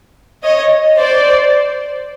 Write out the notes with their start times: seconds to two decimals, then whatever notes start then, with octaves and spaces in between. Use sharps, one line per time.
0.44 C#5 D#5
0.98 C5 D5